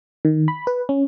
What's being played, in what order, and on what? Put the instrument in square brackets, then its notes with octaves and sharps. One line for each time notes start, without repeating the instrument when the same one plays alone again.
[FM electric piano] D#3
B5
B4
C#4